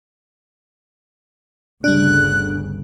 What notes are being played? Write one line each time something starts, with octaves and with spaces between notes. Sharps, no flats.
G1 D2 C#3 G3 D4 F#6